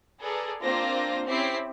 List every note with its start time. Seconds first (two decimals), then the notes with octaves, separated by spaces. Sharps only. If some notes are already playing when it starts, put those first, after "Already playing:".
0.20 G#4 A4 B4 D5 A#5
0.62 A#3 C4 D4 F4 C5 A#6
1.27 C4 C#4 E4 G4 B6 C7